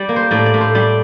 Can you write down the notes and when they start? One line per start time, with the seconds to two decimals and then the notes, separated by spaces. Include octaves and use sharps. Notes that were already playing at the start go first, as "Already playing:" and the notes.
Already playing: G3 D5
0.09 A#3
0.16 C5
0.31 A2 D5
0.46 D5
0.54 A2
0.61 C5
0.75 G3 D5